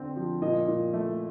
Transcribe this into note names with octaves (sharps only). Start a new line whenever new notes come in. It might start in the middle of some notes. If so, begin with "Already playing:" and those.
Already playing: D3 C4
F3
A#2 D#5
A#2
A3